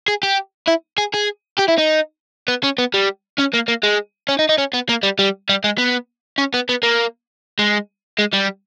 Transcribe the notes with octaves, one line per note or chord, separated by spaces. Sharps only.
G#4
G4
E4
G#4
G#4
G4
E4
D#4
B3
C#4
B3
G3
C#4
A#3
A#3
G#3
C#4
D#4
D#4
C#4
B3
A#3
G3
G3
G3
G#3
B3
C#4
B3
B3
A#3
G#3
G#3
G3